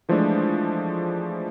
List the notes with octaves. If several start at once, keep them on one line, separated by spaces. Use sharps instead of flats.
E3 F3 G#3 A3 D4